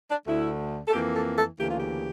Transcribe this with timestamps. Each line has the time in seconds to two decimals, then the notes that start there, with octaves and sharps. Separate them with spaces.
0.10 D4
0.26 D2 D3 A3 E4
0.88 A4
0.92 F2 E3 A#3 G4
1.15 A4
1.37 A4
1.58 D2 C#3 E3 A#3 G4
1.69 F4
1.80 G4